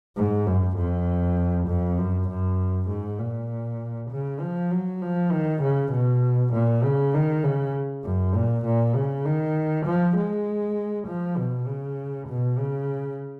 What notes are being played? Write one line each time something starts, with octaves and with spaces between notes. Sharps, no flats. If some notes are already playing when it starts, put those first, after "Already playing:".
G#2
F#2
F2
F2
F#2
F#2
G#2
A#2
C#3
F3
F#3
F3
D#3
C#3
B2
A#2
C#3
D#3
C#3
F#2
A#2
A#2
C#3
D#3
F3
G#3
F3
B2
C#3
B2
C#3